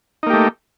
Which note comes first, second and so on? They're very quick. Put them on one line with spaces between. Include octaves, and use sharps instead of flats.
D#4 A#3 G4 A3